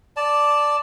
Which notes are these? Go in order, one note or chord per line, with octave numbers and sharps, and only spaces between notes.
D5 A5